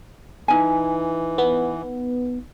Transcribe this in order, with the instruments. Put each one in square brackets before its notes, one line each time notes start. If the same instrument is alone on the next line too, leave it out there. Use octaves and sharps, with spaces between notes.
[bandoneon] E3 [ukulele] D#4 G#5
[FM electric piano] B3